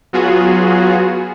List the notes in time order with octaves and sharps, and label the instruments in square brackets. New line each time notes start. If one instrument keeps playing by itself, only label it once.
[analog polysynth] F#3 B3 F4 F#4 G#4